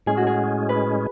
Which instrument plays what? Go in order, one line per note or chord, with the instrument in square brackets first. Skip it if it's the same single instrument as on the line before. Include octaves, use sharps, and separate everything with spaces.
[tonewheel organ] A2 G#3 C#4 [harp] G#4
[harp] F#4
G#4
B4